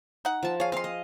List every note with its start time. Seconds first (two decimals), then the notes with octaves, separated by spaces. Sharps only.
0.25 D#4 F#5
0.43 F3 A5
0.60 G#4 C#5 F5
0.72 C4 D#5 F5 C6
0.84 D#5